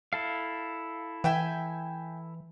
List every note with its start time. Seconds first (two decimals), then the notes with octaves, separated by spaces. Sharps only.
0.13 E4 A4 F5
1.24 E3 E5 G5 G#5